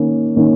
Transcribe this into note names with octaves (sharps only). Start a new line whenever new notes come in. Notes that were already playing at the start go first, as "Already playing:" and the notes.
Already playing: D#3 A#3 C#4
D#3 A#3 C#4